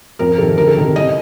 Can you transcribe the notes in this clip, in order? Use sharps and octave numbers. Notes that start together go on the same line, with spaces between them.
F2 A#4
C3 D#3 A4
D2 A#4
A4
C3 D#3 A#4
C2 D#5